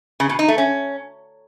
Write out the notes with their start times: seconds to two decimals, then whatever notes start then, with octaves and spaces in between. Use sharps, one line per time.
0.20 C#3
0.29 B2
0.39 D#4
0.48 A3
0.58 C#4